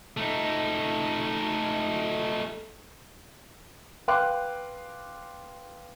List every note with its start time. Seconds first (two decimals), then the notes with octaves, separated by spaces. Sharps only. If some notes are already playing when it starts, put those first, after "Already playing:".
0.17 A3 D#4
4.08 B4 F5 G5 C6 D6 F#6